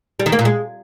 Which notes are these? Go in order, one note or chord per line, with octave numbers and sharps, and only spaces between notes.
G3
D#3
A#3
A#2
G#3